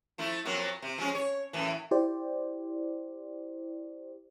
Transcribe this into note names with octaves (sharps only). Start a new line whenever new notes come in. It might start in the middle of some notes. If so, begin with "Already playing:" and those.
F3 A3 E4
F2 F#3 A#3
C3
F3 G#3 C#4
C#5
F#2 A2 E3
E4 G4 C5 D5